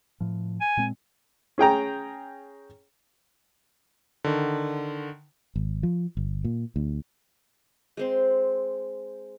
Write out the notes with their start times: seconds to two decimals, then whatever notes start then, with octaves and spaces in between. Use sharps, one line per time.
0.21 A2 F3
0.61 G#5
0.77 A#2 G#3 C4
1.58 C#4 G#4 G5 A#5
4.24 D3 D#3
5.56 G#1
5.83 F3
6.17 G1
6.44 A#2
6.76 D2
7.97 G#3 C4 C6